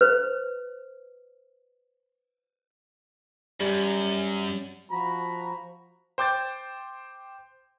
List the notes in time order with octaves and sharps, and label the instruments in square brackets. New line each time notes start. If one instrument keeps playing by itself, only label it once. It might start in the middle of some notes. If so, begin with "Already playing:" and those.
[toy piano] B4 C5
[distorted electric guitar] F#2 [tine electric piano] G3
[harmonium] F3 F#4 A#5 [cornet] B5
[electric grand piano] C5 G5 D6 G6 A6